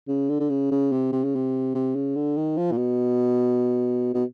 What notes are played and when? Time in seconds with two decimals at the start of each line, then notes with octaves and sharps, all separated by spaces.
0.08 C#3
0.29 D3
0.40 D3
0.50 C#3
0.71 C#3
0.92 C3
1.12 C3
1.24 C#3
1.35 C3
1.75 C3
1.95 C#3
2.16 D3
2.37 D#3
2.57 F3
2.71 A#2
2.78 B2
4.14 B2